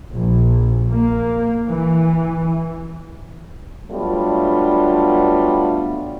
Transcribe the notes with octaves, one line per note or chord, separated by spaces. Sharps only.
A#1
A#3
E3
F#3 G3 A3 B3 D4 F4